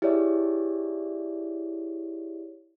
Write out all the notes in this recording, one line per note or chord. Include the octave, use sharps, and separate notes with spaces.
E4 G4 G#4 C#5 D5 E5